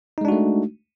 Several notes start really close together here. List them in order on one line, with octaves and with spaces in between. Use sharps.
D#4 G#3 D4 F#4 A3